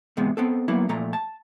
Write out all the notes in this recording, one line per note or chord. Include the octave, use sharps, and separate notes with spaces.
E2 G#2 C3 G#3 B3
B3 C4 A4
F#3 A#3 B3 E4
A#2 F3 A3 A#5
A5